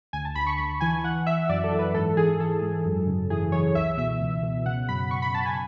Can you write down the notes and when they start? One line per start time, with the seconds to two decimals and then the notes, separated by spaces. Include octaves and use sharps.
0.13 D2 G#5
0.25 A5
0.35 D2 B5
0.47 C#6
0.58 D2 B5
0.81 E3 G#5
1.04 E3 F#5
1.27 E3 E5
1.49 F#2 D5
1.64 A4
1.72 E3
1.79 B4
1.94 G#2 A4
2.17 E3 G#4
2.40 E3 A4
2.62 G#2
2.85 F#2
3.07 C#3
3.30 E3 G#4
3.52 E3 C#5
3.75 C#2 E5
3.97 B2 E5
4.20 C#2
4.43 B2
4.66 C#3 F#5
4.88 F#2 B5
5.11 C#3 C#6
5.22 B5
5.34 F#2 A5
5.46 G#5